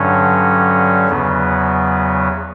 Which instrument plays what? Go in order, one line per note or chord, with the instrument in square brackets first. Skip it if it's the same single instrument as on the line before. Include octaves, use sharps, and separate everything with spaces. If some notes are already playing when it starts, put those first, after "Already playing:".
Already playing: [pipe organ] G2 D3 F#3 C#4
E2 C#3 F#3 B3